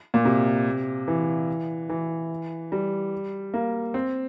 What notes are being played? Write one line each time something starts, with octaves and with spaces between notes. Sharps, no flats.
A#2
C3
E3
E3
G3
A#3
C4